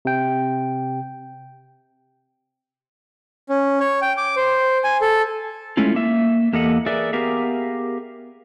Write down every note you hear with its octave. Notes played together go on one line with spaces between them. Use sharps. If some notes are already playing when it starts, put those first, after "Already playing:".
C3 G5
C#4
C#5
G5
D6
C5
G#5
A4
G#3 A3 C#4 E4 F4
A#3 E5
E2 A#3 G4 A4 D#5 F#5
G#4 A#4 B4 D5 E5
B3 G4 G#4 A#4 E5 F5